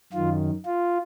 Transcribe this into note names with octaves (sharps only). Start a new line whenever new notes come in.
F#2 D#3 F4
F4